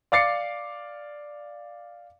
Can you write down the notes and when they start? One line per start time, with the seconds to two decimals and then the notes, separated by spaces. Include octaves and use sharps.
0.12 D5 F5 D6 A6 C7 C#7